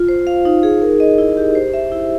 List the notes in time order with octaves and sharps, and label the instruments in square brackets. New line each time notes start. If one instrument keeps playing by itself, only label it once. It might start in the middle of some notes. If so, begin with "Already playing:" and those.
Already playing: [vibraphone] F4
C5
F5
D#4
G#4
A#4
D#5
E4
G4
C5
E5
E4